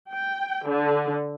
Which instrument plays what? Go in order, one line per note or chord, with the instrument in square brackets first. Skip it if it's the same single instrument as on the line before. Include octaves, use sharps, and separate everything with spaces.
[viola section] G5
D3